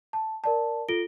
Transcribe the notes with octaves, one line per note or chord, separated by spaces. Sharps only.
A5
A#4 D5 A5
F4 A4 A#6 D7 G7